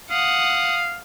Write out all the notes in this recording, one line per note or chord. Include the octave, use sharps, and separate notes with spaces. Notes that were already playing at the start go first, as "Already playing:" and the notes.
F5 F#5 D#6